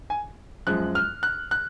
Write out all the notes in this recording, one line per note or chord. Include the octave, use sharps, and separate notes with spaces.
G#5
F#2 F3 G#3 F#6
F6
F#6
F#6